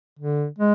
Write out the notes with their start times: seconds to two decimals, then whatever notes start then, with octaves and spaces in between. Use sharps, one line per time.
0.19 D3
0.59 G#3